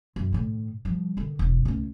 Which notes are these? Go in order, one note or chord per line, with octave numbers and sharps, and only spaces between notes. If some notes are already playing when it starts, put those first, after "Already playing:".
F#2
A2 D#3
F3 G3
D3 D#3
E1
C#2 A3